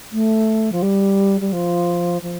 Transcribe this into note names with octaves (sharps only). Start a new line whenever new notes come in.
A3
F3
G3
G3
F3
F3